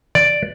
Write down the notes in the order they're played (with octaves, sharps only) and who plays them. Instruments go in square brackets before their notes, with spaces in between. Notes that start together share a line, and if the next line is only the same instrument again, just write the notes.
[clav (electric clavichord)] D5